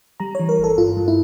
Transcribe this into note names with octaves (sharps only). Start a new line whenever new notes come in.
G3 A#5
E3 C#5
A#4
G1
A4
G2 F4
G2
E4